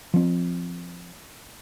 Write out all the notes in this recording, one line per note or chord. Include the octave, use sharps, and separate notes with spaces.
F3 C4